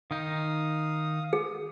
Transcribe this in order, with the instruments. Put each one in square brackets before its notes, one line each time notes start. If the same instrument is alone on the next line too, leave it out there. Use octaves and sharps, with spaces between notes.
[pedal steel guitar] D#3 D#4 [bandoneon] F5 D#6
[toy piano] G#4